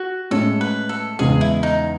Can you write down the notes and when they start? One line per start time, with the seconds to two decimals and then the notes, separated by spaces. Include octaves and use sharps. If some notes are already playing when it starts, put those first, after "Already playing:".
Already playing: F#4
0.31 A2 G#3 C#4 A4
0.61 B4
0.89 A4
1.19 E2 C#3 G#3 G#4
1.41 E4
1.63 D#4